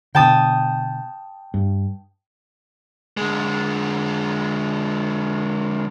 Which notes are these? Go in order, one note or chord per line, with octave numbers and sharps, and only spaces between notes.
B2 D3 G5 A5 D#6
G2
D3 G#3